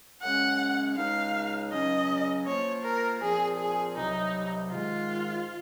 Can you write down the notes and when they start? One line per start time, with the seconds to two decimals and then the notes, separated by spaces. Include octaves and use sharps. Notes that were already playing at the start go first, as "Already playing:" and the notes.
0.22 F#2 C#3 G#3 C#4 F#5
0.96 C#2 C#3 G#3 D#4 F5
1.72 C#2 C#3 F#3 C#4 D#5
2.46 F3 A#3 F4 C5 C#5
2.84 A#4
3.20 A#2 F3 C4 F4 G#4
3.58 G#4
3.96 C2 C3 F#3 D#4
4.70 G#2 D#3 G#3 F4